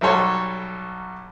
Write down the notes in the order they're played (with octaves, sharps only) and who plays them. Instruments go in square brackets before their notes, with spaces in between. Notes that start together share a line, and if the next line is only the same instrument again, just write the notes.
[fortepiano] B1 F#3 G3 A4 C#5 C6